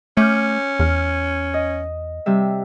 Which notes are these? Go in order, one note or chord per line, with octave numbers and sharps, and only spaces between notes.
A3 C#4 D6 F6 G6
E2 F6
D#5
C3 G3 E5